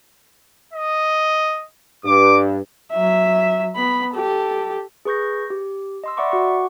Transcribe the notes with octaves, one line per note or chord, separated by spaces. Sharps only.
D#5
G2 D6
F#3 E5
B3 B5
G4 A4
G#4 B4 C#6 G6 A#6
G4
D#5 C6 E6
D5 E5 F#5 B5 C#6 D6
F#4 F#5 C#6 D6